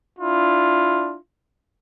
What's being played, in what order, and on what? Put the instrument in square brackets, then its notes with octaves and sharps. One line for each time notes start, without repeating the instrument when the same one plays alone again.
[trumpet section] D4 E4 F4